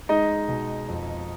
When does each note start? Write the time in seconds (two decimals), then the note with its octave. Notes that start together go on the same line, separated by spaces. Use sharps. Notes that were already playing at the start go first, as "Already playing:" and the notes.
0.09 G#3 D#4 D#5
0.48 B2
0.89 F2